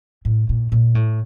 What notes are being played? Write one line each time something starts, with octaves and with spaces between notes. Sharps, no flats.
A2
A#2
A#2
A2